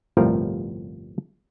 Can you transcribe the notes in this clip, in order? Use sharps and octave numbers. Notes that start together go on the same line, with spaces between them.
G1 C2 A2 F3 G3 A#4